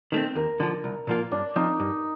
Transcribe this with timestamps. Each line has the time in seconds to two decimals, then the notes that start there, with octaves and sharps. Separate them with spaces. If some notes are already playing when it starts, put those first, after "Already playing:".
0.12 D#3 A3 C4
0.35 D#2 A#4
0.60 D3 F3
0.84 C2
1.07 A#2 F3 A#3 F4
1.31 G2 D4
1.56 F3 C4 D#4
1.80 G2